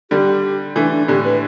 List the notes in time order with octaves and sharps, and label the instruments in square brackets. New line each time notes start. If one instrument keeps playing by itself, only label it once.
[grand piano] D3 G3 [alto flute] G4
[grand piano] E3 A3 [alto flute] D4
[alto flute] D4
[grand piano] A2 D3 [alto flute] G4
[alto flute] B4